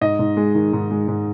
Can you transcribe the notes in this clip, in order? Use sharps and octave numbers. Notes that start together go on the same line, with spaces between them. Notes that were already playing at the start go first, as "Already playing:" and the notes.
G#2 D#5
G#2
G#3
D#3
G#2
G#3
G#2